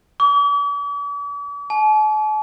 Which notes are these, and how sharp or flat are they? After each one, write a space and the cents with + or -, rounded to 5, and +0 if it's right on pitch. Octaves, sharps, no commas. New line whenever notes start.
D6 -45
A5 -45